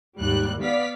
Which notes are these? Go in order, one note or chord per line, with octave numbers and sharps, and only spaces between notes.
D#2 G#2 G3 F#6
B3 D5 F5 B6